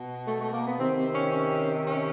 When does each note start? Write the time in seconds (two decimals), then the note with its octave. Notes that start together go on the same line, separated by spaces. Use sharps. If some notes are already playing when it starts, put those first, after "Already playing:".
Already playing: B2
0.27 A3
0.40 A3
0.53 A#3
0.66 B3
0.79 C3 D#3 C4
0.97 C4
1.15 C#4
1.32 C#4
1.85 C#4